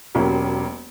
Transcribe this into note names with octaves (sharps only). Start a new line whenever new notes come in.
E1 F#3 A#3 C#4 G4